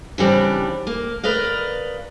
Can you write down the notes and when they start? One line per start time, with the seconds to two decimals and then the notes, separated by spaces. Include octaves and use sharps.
0.18 C#3 E3 G3 C4 D4
0.87 A#3
1.24 A#4 B4 D5 D#5 F5